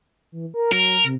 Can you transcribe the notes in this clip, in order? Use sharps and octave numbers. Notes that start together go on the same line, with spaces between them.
E3
A#4
F#3 A#4
C3